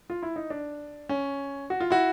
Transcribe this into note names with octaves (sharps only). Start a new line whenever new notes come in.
F4
E4
D#4
D4
C#4
F#4
F4
E4 F#4